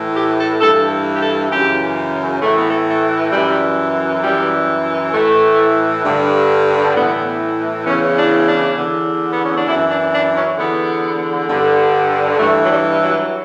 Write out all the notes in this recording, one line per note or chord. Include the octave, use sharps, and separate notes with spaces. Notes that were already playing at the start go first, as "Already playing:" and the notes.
Already playing: A2 E3
G4
A4
G2 E3 A4
G4
A4
F#2 C#3 E3 G4
A2 E3 A3
B3
A3
A3
F#2 E3 G3
F#2 E3 G3
A2 E3 A3
G2 D3
A2 E3 B3
E2 C#3 E3 C#4
D4
D4
E2 D3
B3
C#4
D4
F#2 E3 E4
D4
D4
C#4
E2 D3 B3
G2 D3
G2 E3 A3
F#3
G3
F#3